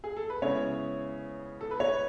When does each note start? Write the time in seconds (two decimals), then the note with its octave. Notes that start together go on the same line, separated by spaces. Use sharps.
0.04 G#4
0.17 A4
0.30 B4
0.42 C#3 G#3 B3 E4 C#5
1.61 A4
1.71 B4
1.80 C#5